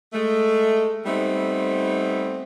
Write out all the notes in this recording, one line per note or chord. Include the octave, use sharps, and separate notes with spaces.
G#3 A3
G3 A3 B3 C4 D#4